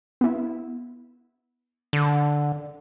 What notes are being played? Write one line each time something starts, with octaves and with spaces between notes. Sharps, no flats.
B3 E4
D3